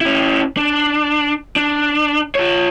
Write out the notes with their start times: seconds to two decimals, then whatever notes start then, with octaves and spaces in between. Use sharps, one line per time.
0.01 C#4 E4
0.57 D4
1.56 D4
2.35 F4 C#5